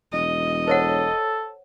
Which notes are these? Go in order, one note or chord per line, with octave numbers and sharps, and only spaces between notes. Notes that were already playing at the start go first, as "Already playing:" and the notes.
E1 D#5
A4 C5 C#5 F#5